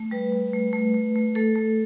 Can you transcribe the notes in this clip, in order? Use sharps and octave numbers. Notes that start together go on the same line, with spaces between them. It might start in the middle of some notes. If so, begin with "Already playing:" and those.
Already playing: A3
G3 B4
G3
A3
A3
A3
A3
A3 A4
A3